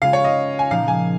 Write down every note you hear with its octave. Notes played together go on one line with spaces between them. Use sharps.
C#3 G#3 F4 G#4 F5
C#5
D#5
G#5
A#2 F3 A#3 D#4 F5
G#5